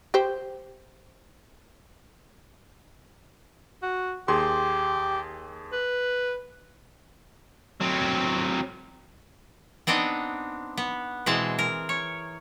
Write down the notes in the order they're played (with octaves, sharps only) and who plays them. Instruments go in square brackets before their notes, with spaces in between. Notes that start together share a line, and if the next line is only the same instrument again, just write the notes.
[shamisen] G4 C5
[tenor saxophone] F#4
[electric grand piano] D#2 G#4 C6 [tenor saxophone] G4
[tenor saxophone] B4
[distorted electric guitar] F#3 C4
[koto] B3 C4 D4 D#4 D#5
B3
B2 E3 G#3 C4 G#4 A5
A#4
C#5